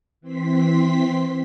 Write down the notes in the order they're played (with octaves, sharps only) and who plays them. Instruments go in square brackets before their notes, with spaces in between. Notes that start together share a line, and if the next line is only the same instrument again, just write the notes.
[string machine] E3 C4 C6 B6